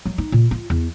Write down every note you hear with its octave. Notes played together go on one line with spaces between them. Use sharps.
F#3
D#4
A#2
F4
E2